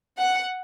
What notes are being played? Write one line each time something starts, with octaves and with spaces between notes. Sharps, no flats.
F#5